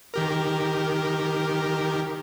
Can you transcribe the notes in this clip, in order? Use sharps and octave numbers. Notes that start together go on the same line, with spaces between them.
D#3 G4 A#4